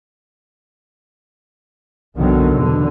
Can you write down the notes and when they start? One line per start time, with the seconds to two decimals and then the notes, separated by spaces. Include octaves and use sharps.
2.16 F#1 B1 B2 D3 D#3 F#3
2.54 E2 B2 D3